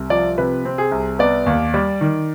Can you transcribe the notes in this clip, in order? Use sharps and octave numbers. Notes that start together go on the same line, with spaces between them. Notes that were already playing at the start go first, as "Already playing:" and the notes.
Already playing: C2
F3 D5
C3 B4
C4
G#4
C2
B3 D5
D#2
G3
D#3